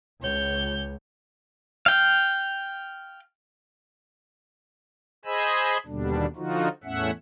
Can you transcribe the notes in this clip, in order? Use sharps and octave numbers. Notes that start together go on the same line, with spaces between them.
C#2 C#5 G6
F5 G5
G#4 C5 D#5 G#5 B5 E6
D#2 B2 D3 G3 D4
D3 F3 D#4 F4 F#4
E2 A2 A3 C#4 E5 F#5